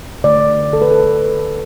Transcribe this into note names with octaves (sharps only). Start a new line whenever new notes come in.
D3 A3 D5
A4
B4
A4